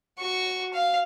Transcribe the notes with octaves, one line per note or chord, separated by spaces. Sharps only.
F#4 C#6
F5